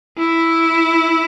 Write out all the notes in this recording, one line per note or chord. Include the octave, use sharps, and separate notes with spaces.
E4